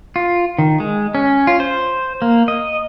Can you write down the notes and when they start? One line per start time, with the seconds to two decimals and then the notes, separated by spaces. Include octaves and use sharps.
0.16 F4
0.59 D#3
0.80 G#3
1.15 C#4
1.47 F4
1.60 C5
2.22 A#3
2.48 D#5